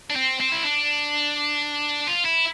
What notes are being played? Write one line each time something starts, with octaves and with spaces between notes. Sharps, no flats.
D4
C4
C4
E4
D4
F4
E4